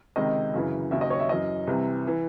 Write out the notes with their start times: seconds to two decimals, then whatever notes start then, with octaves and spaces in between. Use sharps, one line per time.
0.16 C#2 C3 D#3 D#5
0.54 F#2 C#3 E3
0.91 D#2 C#3 F#3 E5
1.01 D#5
1.10 C#5
1.20 E5
1.29 F#2 E3 D#5
1.67 C2 C3 E3
2.07 E3